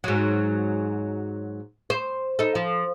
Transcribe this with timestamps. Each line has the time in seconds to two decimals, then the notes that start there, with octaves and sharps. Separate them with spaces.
0.04 G#2 F#3
1.90 C5
2.39 D#4 A4
2.55 F3